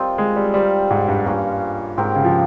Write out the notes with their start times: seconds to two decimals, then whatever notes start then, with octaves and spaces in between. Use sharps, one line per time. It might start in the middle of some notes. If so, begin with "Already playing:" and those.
Already playing: G3 C4 F4 A#4 D#5
0.18 G#3
0.36 G3
0.54 G3 D#4 G4 C5 F5
0.90 G#2
1.08 G2
1.26 G2 A#3 C#4 F4
1.98 G#2 C4 G4 A#4
2.15 C#3
2.24 F3